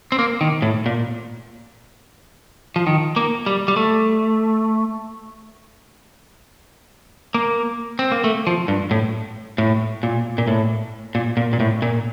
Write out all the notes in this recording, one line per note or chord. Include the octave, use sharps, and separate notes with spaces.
C4
A#3
D#3
A2
A#2
F3
D#3
A#3
G3
G3
A3
A#3
C4
A#3
A3
F3
G2
A2
A2
A#2
A#2
A2
A#2
A#2
A#2
A2
A#2